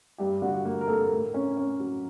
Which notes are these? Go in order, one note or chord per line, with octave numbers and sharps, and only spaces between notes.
G2 G4
D3 F#4
F#4
A#3
A#4
A#3 A4
A#4
A2
C#4
C#4
F#3